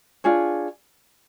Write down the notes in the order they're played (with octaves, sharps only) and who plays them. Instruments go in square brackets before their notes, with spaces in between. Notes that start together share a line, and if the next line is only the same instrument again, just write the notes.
[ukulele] D4 F4 G#4 C#5